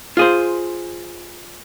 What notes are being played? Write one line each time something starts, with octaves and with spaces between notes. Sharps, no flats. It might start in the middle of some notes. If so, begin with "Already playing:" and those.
F4 G#4 C5